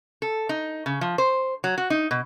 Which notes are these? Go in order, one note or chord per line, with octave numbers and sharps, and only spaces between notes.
A4
D#4
C#3
F3
C5
F#3
F#4
D#4
B2